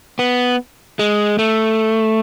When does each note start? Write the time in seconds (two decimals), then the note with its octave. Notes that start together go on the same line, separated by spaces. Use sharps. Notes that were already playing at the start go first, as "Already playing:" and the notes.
0.19 B3
0.99 G#3
1.39 A3